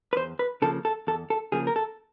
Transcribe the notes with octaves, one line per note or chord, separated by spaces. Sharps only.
B4
E2 C5
B4
C#3 F3 A#3 A4
A4
E2 A4
A4
C#3 F3 A#3 G#4
A#4
A4